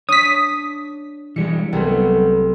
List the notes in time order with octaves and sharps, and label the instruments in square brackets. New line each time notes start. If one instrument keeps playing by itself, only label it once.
[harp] D4 [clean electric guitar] C#5 [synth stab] D#6 B6
[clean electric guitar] E3 G3 G#3 [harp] C#7
[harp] C2 F#3 A3 [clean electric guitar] G3 B3